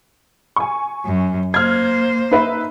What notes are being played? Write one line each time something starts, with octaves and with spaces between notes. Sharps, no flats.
G#5 C#6
F#2
A#3 C5 F6 G#6
D#4 B4 E5